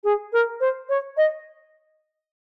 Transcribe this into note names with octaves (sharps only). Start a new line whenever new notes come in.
G#4
A#4
C5
C#5
D#5